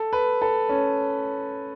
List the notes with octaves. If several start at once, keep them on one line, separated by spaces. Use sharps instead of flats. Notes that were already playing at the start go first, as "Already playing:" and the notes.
Already playing: A4
B4
A4
C#4